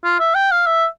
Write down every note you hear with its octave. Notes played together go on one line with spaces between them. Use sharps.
F4
E5
G5
F5
E5